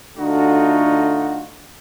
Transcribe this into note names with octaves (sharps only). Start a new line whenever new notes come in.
D3 A3 D4 D#4 F4 F#4